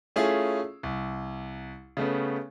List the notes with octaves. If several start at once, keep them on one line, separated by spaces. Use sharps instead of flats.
A3 C#4 E4 F4 G#4
C2
C#3 A3 B3 C#4